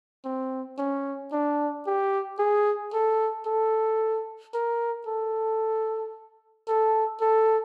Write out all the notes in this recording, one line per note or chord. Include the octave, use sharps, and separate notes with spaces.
C4
C#4
D4
G4
G#4
A4
A4
A#4
A4
A4
A4